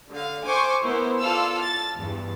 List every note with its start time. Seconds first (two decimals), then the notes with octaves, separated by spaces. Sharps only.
0.10 D3 F5
0.46 C5 G#5 C#6 D6
0.84 B3 E4 A#4 C5
1.20 F4 A4 D5 F5 E6
1.61 A6
1.98 E2 G2